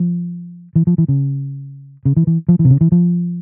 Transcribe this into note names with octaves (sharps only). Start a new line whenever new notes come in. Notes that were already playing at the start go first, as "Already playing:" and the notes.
Already playing: F3
E3
F3
E3
C#3
C#3
E3
E3
F3
E3
C3
C#3
E3
F3